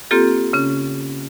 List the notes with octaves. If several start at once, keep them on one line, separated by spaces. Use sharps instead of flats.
A#3 C4 F4 G4 A4
C#3 C#4